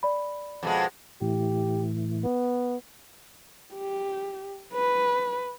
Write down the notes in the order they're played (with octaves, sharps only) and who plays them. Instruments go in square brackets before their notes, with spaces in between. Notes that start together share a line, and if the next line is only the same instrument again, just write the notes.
[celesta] D5 B5
[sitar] F2 B2 G#3
[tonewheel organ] A2 E3 [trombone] G4
[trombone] B3
[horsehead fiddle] G4
B4